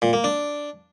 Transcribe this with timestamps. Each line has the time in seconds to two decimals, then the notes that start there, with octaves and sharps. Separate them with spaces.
0.02 A#2
0.13 A#3
0.24 D4